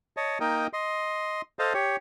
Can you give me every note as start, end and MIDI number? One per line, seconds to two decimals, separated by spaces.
0.17 0.38 73
0.17 0.38 75
0.17 0.38 81
0.40 0.67 58
0.40 0.67 63
0.40 0.67 70
0.40 0.67 75
0.40 0.67 79
0.73 1.42 75
0.73 1.42 84
1.59 1.73 69
1.59 1.73 72
1.59 1.73 75
1.59 1.73 77
1.59 1.73 81
1.74 1.96 67
1.74 1.96 73